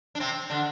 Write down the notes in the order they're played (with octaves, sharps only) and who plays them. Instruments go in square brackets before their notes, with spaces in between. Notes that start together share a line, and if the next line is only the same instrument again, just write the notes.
[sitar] D4
C3 C4
D3 D4